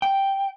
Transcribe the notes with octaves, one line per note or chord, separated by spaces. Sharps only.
G5